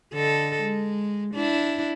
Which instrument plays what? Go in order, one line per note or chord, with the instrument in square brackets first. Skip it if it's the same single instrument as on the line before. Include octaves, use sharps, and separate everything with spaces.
[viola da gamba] D3 A4 D#5
G#3
D4 E4